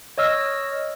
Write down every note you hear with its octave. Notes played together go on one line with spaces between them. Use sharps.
C#5 D#5 E6 F6 A#6